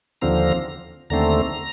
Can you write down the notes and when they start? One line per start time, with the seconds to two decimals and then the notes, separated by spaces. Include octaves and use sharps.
0.21 D#2 D3 F3 C4 A#5
1.10 D#2 D3 A3 C4 A#5